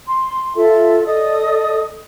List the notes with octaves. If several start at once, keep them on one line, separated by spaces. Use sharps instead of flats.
C6
F4 A4 E5
A4 D5 D#5 D#6